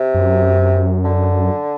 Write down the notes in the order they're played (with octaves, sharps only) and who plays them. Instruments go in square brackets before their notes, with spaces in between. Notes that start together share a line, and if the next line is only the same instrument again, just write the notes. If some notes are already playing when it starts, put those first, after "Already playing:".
Already playing: [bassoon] C3
[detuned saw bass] F#2
[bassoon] D3